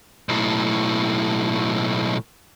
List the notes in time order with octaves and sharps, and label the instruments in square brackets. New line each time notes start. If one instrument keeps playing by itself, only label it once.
[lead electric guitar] B1 A2